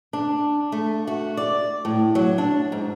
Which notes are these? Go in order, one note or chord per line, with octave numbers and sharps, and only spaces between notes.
D4
A3
F#4
D5
A2
F#3
D4
G#2